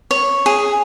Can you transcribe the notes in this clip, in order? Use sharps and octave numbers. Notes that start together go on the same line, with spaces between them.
C#5
G#4